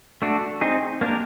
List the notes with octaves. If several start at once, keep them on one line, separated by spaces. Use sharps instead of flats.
A3 D4 F#4
C4 D#4 G#4
A#3 D4 G4 A#4